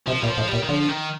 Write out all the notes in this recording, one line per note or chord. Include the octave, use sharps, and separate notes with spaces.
C3 F3
A#2 G3
F3
A2
G3
A#2
D#3
D3 F3
D#3